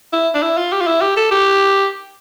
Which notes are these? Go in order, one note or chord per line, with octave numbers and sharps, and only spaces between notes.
E4
D4
E4
F4
G4
F4
E4
G4
A4
G4